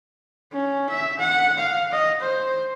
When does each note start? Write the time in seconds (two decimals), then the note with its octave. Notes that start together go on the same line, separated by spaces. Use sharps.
0.52 C#4
0.89 E5
1.19 F#5
1.58 F5
1.92 D#5
2.21 C5